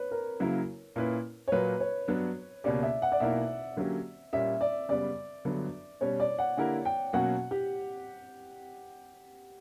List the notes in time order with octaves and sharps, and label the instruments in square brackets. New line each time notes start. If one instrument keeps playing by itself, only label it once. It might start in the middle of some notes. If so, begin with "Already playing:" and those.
Already playing: [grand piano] B4 C#5
A#4
[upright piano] C#3 F#3 A#3 E4 A#4
A#2 A#3 C#4 E4 B4
[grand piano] C#5
[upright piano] A#2 F#3 A#3 [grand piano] B4
[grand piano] C#5
[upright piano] G2 F#3 B3 D4
[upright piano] C#2 B2 A#3 C#4 G4 [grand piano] D5
[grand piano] E5
F#5
D5
[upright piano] B1 B2 A#3 E4 A#4 [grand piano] E5
[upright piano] D3 F#3 A#3 C#4 G4
[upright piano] A#2 G3 A#3 C#4 [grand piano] E5
[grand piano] D5
[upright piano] F#2 C#3 G3 B3 [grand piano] D5
[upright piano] G1 G2 D3 F#3 B3
[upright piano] B2 G3 C#4 [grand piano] C#5
[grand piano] D5
F#5
[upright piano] D3 A#3 E4 G4 A#4 [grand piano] F#5
[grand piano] G5
[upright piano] B2 F#3 A#3 C#4 F#4 [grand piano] F#5
[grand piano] G4